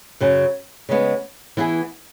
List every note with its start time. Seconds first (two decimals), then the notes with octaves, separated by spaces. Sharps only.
0.20 F#2 C#3 F#3
0.89 C#3 G#3 B3
1.57 E3 B3 E4 G#4